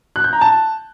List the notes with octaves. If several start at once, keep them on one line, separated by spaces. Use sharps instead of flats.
F#6
G6
A#5
A5